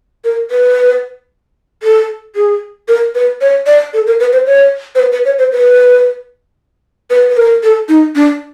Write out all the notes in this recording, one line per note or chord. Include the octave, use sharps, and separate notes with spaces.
A#4
B4
A4
G#4
A#4
B4
C#5
D5
A4
A#4
B4
C5
C#5
C5
B4
B4
C#5
C5
B4
B4
B4
A#4
A4
D#4
D4